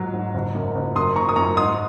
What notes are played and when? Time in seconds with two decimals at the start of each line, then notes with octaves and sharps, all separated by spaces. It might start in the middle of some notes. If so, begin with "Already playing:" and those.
Already playing: G#2 F#3
0.13 G#2
0.34 F#1
0.55 F#2
0.75 F#1
0.95 F#2 C6 D#6
1.15 D#3 A#5 C#6
1.29 D#6
1.36 F#2 A#5 C#6
1.57 G#2 C6 D#6